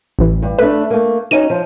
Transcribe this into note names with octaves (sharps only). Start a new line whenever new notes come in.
A1 E3
G2
A3 D4 B4
A3 A#3
C#4 D#4 F#4 D#7
F3